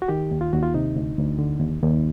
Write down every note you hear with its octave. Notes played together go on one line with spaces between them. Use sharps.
F#4
D#3 G4
D#2
F4
D#2 F#4
F4
C3 D#4
D2
D2
D3
D#2
D#2